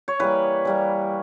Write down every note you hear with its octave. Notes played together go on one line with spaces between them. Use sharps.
C#5
E3 G3 A#3 B4
E3 G3 A#3